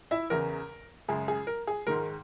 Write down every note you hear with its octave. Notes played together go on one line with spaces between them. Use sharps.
E4 E5
E2 C#3 E3 A#4
F#2 C#3 G#3 G#4
G#4
A#4
G#4
G#2 D#3 G#3 A#4